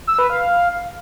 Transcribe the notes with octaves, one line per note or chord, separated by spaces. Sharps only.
E6
B4
F5